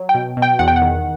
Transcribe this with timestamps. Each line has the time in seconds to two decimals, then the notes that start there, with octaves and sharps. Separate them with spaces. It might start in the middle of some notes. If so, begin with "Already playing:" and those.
Already playing: F#3
0.09 G5
0.15 B2
0.37 B2
0.42 G5
0.59 E2 F#5
0.68 G5
0.76 F#5
0.82 D#3